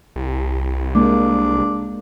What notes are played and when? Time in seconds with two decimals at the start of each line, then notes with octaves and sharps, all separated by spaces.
0.16 C2
0.95 G#3 A#3 D4